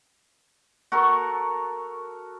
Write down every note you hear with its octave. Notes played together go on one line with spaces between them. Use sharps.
F#4 A4 A#4 C#6